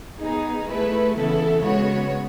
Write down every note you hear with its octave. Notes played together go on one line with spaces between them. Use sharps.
B3 D#4 G#4
A3 E4 G#4 B4
C#3 E3 B3 E4 A4
C#3 G#3 B3 F#4 C#5